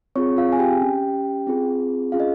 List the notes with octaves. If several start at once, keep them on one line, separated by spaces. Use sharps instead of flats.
C4 F4 G#4 C#5 C#6
F4 F5
G#5
G4 G5
C#4 G4
C4 F4 G#4
C#4 F4 G#4 F5
D#5